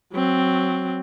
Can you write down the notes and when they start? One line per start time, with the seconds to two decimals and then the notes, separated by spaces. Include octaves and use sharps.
0.13 F#3 C4